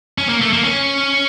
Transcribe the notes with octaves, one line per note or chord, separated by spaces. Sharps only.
C#4
A#3
A3
A#3
C#4